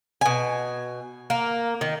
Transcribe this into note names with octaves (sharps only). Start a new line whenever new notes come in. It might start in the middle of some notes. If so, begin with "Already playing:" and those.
B2 G#5
A#3
D#3